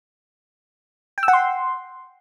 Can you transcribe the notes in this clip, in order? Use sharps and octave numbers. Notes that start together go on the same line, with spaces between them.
G5
E6
F#5
C6